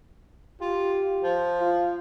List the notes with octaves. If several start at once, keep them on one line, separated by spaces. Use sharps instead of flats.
F4 G4
F3
F4